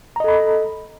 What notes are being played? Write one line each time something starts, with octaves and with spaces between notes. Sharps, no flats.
A4 D#5 A#5 B5